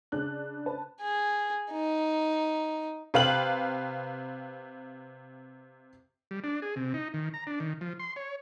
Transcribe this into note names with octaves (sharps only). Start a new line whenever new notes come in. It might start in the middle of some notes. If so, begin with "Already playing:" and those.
C#3 D4 F#6
B4 A5
G#4
D#4
C3 B4 F5 G5 F#7
G3
D4
G#4
C3
D#4
D#3
A#5
D4
D#3
F3
C6
C#5